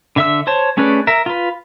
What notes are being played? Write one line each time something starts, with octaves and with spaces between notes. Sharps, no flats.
D3 E5 E6
C5 C#5 A5
A3 C#4 G#4 B4 D5
A#4 E5
F4 B4